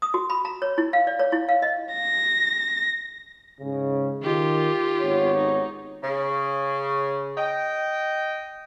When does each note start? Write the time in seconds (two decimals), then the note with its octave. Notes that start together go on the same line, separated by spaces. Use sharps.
0.02 D#6
0.14 F#4
0.30 B5
0.45 A#5
0.62 C#5
0.78 E4
0.93 F5
1.07 D5
1.19 C#5
1.32 E4
1.49 F5
1.62 D#5
1.94 A#6
3.59 G#2 C#3
4.23 D#3 F4 G4
5.01 G#1 B3 C#5
5.37 D#4
6.03 C#3
7.37 D#5 G5